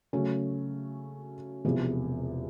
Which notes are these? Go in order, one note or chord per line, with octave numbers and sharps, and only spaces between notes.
C#3 F#3 A3 C#4
E1 E2 C3 F3